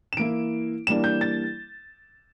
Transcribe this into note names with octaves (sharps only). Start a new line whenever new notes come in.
E7
E3 A#3 E4 D7
E3 G3 A#3 D4 E7
G6
A6